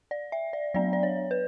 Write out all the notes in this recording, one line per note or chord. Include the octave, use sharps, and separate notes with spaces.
D5
E5
D5
F#3 B3 D4 D5
D5
C#5
B4